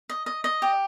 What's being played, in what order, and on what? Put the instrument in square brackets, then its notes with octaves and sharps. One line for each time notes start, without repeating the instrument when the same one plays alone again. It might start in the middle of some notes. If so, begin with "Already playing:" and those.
[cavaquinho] D#5
D#5
D#5
G4